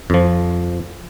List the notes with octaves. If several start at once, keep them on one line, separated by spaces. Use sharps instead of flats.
F2 F3